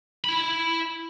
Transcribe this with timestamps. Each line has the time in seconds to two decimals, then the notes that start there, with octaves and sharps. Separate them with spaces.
0.25 E4 B5